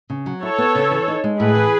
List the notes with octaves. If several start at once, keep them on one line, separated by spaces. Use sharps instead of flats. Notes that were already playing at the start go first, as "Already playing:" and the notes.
C#3
F#3
E4 A4 C#5
B3
C#3
E3
D#4
G#3
A2 G#4 B4
E3